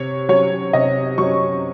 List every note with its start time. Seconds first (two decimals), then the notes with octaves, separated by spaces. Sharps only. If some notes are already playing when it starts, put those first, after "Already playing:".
Already playing: C3 C#5
0.29 F#3 C#4 C#5
0.73 C3 D#5
1.18 F#3 C#4 C#6